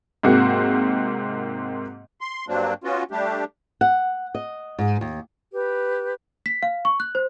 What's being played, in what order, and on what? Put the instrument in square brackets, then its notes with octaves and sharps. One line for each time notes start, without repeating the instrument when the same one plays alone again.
[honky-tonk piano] G#2 C3 A#3 C4 F#4
[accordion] C6
G2 F#3 A#3 C4 D4
B3 C#4 F4 F#4
G3 A3 D4 G4
[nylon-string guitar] F#5
D#5
G#2
D#2
[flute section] G4 B4
[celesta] B6
F5
C#6
F#6
C5